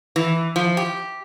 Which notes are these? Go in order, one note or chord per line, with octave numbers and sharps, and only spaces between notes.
E3
F3
G4